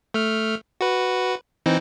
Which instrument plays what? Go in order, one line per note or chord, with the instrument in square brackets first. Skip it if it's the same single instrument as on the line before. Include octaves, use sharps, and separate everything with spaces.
[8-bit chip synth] A3 F6
F#4 B4
E3 C4 D#4